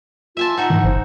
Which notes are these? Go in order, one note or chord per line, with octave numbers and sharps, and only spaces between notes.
F4 E5 G#5 A5
D#4 F#4 E5 F#5
G#2 E3
G1 C5